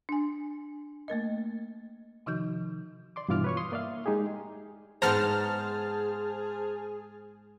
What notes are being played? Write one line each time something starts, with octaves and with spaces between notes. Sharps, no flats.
D4 G#5
A3 A#3 A#4 D#5
C3 D#3 F3 D#4 F#4 G6
D5 C6 D6
G2 B2 E3 F4 D6 F6
B4 C#5 C#6
C6 D#6
A#3 D5 E5 F5
G#3 D#4 G4 G#4
G#2 B3 G#4 C5 A5 A#5 F6